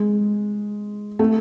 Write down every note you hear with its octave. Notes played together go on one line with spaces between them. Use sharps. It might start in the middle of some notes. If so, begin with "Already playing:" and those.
Already playing: G#3
A3